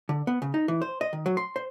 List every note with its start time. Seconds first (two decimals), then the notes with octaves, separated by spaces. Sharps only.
0.09 D3
0.27 B3
0.42 C#3
0.54 D#4
0.68 E3
0.82 C5
1.01 D#5
1.13 D#3
1.26 F#3
1.37 C6
1.56 C5